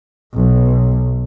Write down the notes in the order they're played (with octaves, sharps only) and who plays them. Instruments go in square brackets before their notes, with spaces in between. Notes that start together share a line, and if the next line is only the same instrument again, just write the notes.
[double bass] B1